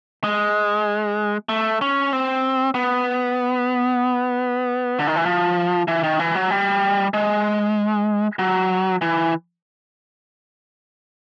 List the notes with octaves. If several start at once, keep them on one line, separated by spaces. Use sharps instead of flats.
G#3
A3
C#4
C4
B3
D3
D#3
E3
F3
E3
D#3
E3
F#3
G3
G#3
F#3
E3